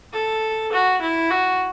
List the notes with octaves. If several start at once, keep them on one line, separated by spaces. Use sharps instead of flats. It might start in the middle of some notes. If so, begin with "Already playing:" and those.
A4
F#4
E4
F#4